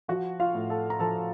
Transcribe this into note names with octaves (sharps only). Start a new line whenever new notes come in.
F3 F#4 F#5
F4 F5
A2
A4 A5
A#5
F3 A4 A5